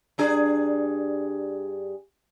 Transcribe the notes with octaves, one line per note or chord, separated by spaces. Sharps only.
G2 D4 G#4